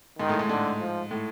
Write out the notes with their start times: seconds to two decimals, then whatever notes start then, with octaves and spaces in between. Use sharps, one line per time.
0.19 G#2 D#3
0.29 A2
0.39 G#2
0.50 G#2 D3
0.80 F3
1.11 A2